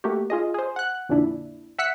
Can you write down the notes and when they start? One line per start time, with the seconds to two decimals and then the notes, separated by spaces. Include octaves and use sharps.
0.04 A3 A#3 F#4 G4
0.30 F4 G#4 D#5
0.54 G#4 C5
0.76 F#5 F#6
1.09 F2 A#2 D3 D4 E4
1.79 E5 F#5 E6 F#6 B6 C#7